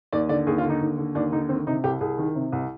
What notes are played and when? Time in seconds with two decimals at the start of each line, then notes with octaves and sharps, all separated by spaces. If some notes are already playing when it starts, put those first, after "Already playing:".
0.13 D#2 D5
0.29 D3 D5
0.47 D#2 G#4
0.58 F4
0.64 D3
0.70 D#4
0.81 D#2
0.98 D3
1.15 D#2 D4
1.32 D3 D#4
1.49 D#3 C4
1.67 C3 D#4
1.84 C2 G4
2.00 C2 G#4
2.18 D#3
2.35 C3
2.52 C2